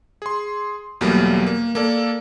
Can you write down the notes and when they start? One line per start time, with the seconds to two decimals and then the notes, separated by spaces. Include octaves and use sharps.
0.22 G#4 C6
1.01 E2 B2 F#3 G3 A3 A#3
1.47 A#3
1.75 A#3 A4 D5